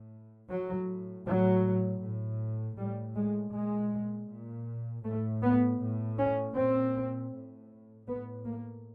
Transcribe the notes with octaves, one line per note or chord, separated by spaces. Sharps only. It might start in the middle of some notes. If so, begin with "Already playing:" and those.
Already playing: A2
A2 F#3
A2 F#3
A2
A2 G3
G#3
A#2 G#3
A#2
A2 A3
B3
A2
C#4
A#2 C4
A2
A2 B3
A#3